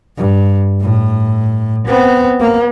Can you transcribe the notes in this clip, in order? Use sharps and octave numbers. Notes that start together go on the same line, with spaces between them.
G2
A2
B3 C4
A#3